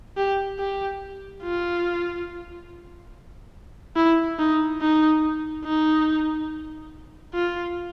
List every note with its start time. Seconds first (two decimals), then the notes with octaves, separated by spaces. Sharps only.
0.17 G4
0.58 G4
1.42 F4
3.96 E4
4.39 D#4
4.81 D#4
5.64 D#4
7.34 F4